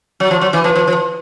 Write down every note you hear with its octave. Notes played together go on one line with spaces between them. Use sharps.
F#3
F3
F#3
E3
F3
F3
F3